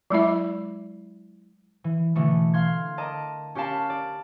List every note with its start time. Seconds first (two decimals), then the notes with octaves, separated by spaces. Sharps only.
0.10 F#3 G#3 E4 E5
1.84 E3
2.15 B2 D3 E3 G#3 A3
2.54 F5 C6 G#6
2.98 A#4 D5 D#5 A5 A#5
3.55 C#4 G4 A#4 F5 A5 B5
3.90 D5